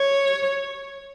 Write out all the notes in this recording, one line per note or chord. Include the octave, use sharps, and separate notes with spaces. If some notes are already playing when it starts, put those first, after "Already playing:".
Already playing: C#5